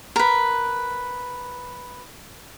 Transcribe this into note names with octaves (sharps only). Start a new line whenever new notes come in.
A#4 B4